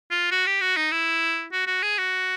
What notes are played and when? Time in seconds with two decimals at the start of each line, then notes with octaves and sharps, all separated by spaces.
0.11 F4
0.31 F#4
0.46 G4
0.61 F#4
0.77 D#4
0.91 E4
1.53 F#4
1.67 F#4
1.83 G#4
1.98 F#4